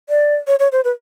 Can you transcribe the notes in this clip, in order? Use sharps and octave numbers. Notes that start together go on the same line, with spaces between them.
D5
C#5
C#5
C5
B4